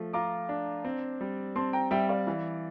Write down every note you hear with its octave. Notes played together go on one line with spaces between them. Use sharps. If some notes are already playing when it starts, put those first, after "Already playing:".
Already playing: F3 A3
F4 A#5 D6
D4
C4
G3
C4 A5 C6
G5 A#5
G3 E5 G5
D5 F5
E3